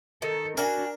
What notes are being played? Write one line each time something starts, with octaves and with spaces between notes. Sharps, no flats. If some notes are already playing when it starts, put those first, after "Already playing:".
D#3 A4
D4 F#4 A#4 G#5